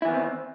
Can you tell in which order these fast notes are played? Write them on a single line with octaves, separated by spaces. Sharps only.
E4 E3 B3 D#3 C4